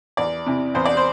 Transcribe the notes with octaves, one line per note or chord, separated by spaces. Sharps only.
E2 D5
C3 E3
E2 C5
D5
C5